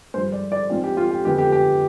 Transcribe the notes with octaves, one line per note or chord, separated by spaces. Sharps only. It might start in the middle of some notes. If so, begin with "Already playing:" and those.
G2 F3 G#3 C5
D5
D5
G#2 F3 C4 F4
G4
F4
G4
F2 D3 G#3 B3 G4
G4
G4